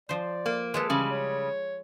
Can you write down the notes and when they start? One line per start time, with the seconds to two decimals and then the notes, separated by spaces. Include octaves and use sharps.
0.09 F3 C5 D5
0.46 A#3
0.74 G#3 G#4 A4 B4
0.90 C#3 E3 G3
1.11 C#5